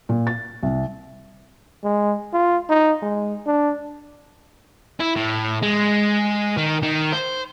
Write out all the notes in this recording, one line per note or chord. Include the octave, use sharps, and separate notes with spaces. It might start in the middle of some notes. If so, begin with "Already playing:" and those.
A#2
A6
C2
G#3
F4
D#4
G#3
D4
E4
A2
G#3
D#3
D#3
C5